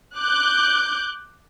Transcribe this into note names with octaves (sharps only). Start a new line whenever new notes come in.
D6 F#6 G6